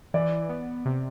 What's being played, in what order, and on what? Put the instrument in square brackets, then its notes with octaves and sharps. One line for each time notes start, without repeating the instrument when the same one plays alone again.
[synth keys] E3 [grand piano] D5
[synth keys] B3
C3